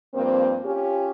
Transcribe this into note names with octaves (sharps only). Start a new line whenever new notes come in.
G2 F3 A#3 C4
C#4 F4 G4